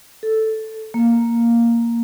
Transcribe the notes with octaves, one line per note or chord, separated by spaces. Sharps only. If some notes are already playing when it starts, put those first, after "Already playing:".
A4
A#3